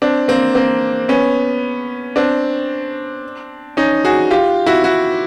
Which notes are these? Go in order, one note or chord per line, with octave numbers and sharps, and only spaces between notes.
C4 D4
A#3 C4
A#3 C4
B3 C#4
C4 D4
C#4 D#4
F#4 G#4
F4 G4
E4 F#4
E4 F#4